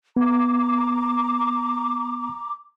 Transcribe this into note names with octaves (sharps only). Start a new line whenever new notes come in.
B3 A#5 D6